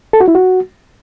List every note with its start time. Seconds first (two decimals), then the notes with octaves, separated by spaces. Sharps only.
0.13 A4
0.21 F#4
0.28 E4
0.35 F#4